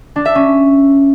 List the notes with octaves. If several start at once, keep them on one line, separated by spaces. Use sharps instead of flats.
D4
E5
C#4